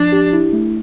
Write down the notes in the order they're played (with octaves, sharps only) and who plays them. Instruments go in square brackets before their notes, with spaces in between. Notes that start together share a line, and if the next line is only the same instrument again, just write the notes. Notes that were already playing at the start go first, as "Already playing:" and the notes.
Already playing: [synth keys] F3 [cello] D4
[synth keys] G4
E4
A3